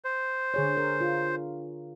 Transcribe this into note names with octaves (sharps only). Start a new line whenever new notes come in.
C5
D3 G#4 C#5
A#4
F4